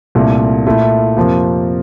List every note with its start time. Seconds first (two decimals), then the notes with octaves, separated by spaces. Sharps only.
0.15 C2 A#2 A3
0.66 A#2 A3 E4
1.17 F2 C3 F3 A#3